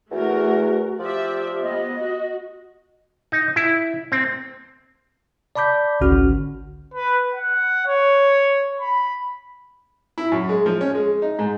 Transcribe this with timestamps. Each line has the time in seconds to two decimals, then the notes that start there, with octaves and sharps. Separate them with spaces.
0.11 E2 A3 F#4 A#4
0.99 F3 G4 D5 E5
1.62 B3 D#5
1.97 F#4
3.32 D#4
3.56 E4
4.12 C4
5.55 D5 A5 B5 D6 G6 B6
6.01 G#1 C#2 D3 C#4 F#4 F6
6.94 B4
7.35 F#5
7.86 C#5
8.81 B5
10.18 E4
10.32 F#2
10.49 G#3
10.66 F3
10.81 C#4
10.95 G#3
11.22 D#4
11.39 G#2